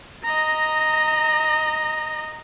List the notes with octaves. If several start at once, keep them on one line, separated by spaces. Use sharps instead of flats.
D#5 A#5